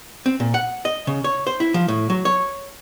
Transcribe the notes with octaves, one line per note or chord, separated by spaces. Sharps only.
C4
A#2
F#5
D#5
C#3
C#5
C5
E4
F3
A2
F#3
C#5